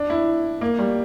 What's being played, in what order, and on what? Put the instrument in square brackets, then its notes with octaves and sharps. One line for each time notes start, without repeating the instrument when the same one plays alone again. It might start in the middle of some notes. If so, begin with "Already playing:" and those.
Already playing: [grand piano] D4
E4
A#3
G3